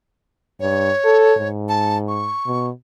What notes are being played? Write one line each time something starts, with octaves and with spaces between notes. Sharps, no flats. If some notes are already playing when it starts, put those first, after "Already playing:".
G2 C#5
A4
G#2
A5
C#6
B2